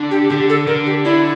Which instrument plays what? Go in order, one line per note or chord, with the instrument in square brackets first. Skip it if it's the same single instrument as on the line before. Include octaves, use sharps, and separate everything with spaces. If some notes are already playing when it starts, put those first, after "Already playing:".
Already playing: [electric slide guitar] D3 D4
[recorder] G4
[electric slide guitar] D3 [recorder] G4
[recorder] A4
[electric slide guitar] D3 [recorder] A#4
[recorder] G4
[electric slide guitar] D4 [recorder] E4